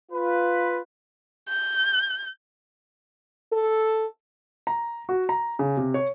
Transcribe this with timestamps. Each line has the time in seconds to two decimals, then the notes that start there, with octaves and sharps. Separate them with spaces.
0.11 F4 B4
1.48 G6
3.52 A4
4.67 A#5
5.09 F#4
5.29 A#5
5.59 C#3
5.77 C3
5.94 C#5